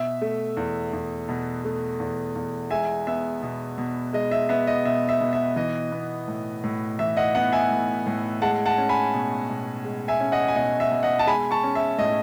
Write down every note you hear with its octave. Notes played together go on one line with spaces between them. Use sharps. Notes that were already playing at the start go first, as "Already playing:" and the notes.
Already playing: B2 E5
A3
E2
E2
B2
A3
E2
E2
G#3 E5 G#5
B3 E5
B2
B2
G#3 D#5
E5
B3 E5
D#5
B2 E5
E5
B2
E5
E3 D#5
B3
A2
A2
E3 E5
D#5 F#5
B3 D#5 F#5
E5 G#5
A2
A2
G#3 F#5 A5
F#5 A5
C#4
G#5 B5
B2
B2
G#3
E5 G#5
C#4
D#5 F#5
G#5
B2 D#5 F#5
E5
B2
D#5 F#5
A5
G#3 G#5 B5
A5 C#6
C#4
E5
A2 D#5